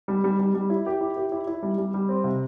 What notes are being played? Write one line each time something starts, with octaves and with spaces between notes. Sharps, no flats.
G3
G3
G3
G3
E4
G4
E4
G4
E4
E4
G3
G3
G3
C4
C3